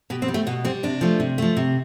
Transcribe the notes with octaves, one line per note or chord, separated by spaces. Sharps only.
B2 G4
C4
G3
A3
B2 B3
G3 C4
C3 D4
F3 A3
C3
F3 A3
C3